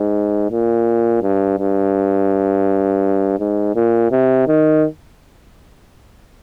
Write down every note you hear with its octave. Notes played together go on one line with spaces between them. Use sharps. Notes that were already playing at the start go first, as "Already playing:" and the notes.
Already playing: G#2
A#2
G2
G2
G#2
A#2
C3
D#3